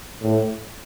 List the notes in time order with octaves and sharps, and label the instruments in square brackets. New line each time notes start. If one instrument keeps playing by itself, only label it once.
[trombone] A2